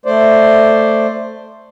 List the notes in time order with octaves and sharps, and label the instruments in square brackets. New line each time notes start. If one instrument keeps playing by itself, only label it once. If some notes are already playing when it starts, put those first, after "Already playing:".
[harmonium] A3 C5 D5